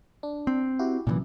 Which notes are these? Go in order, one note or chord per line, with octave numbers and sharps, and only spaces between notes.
D4
C4
E4 F#4 G4
C2 F#2 A#2 C#3 E3